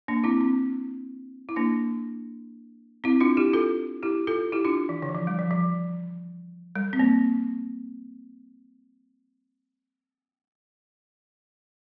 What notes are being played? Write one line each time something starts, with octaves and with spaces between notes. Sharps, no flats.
A#3 D4
C4 E4
C4
E4
A#3 D4
C4 E4
D4 F4
E4 G4
F4 A4
E4 G4
F4 A4
E4 G4
D4 F4
E3
D3
E3
F3
G3
F3
F3
G3
C4
A#3